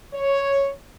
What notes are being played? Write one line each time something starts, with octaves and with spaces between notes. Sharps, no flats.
C#5